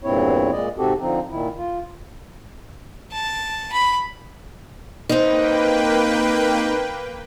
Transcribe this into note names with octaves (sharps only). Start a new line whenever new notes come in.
E2 G2 A#2 C4 E4 C#5
A#2 G#3 D5 D#5
G#2 C3 C4 F#4 G4 A4
D3 F3 C4 D#4
A#2 D#3 E4
F4
A5
B5
A#3 C4 D#4 B4 G5